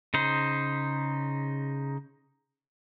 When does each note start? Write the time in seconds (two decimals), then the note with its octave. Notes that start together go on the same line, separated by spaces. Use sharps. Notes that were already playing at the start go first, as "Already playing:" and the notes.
0.14 C#3 D#4 C5